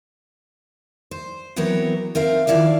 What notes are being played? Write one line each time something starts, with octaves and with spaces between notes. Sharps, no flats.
C5
E3 F#3 B3 C4 A#4 C#5
C4 A#4 E5 F5
D#3 F3 E4 D5 F5